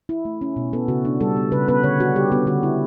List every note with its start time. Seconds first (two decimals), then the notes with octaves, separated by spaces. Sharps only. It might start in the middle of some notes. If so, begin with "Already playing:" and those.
0.09 E4
0.25 A3
0.41 C#4
0.56 B2
0.73 B3 A4
0.88 C#3 F#4
1.05 D4
1.21 G3 A4
1.37 B3
1.52 C#3 B4
1.68 B3 B4
1.84 D3 C#5
2.00 D4 F#4
2.15 G3 G4
2.32 B3 F#4
2.47 D3 F#4
2.63 E4